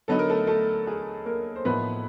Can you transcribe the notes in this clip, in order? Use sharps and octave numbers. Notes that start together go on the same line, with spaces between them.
D3 F#3 B3 D#4 A4
A#4
A3 A4
A3 A4
G#4
A#3 A#4
C5
A2 F3 A#3 B3 D#4 B4